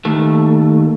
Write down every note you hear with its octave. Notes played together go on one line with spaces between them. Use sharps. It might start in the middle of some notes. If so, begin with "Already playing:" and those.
D#2 A3